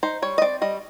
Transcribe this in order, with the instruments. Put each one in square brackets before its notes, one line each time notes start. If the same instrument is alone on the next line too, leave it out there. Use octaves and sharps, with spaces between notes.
[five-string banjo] D#4 C5
G3 C#5
D#5
C4 D5
G3 D#5